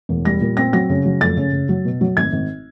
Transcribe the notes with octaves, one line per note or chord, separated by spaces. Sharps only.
E1
G3 A#6
A#2
C4 A#6
F#3 A#6
C#3
F#3
F2 A6
C#3
C#3
F#3
B2
F#3
G#1 G#6
G#1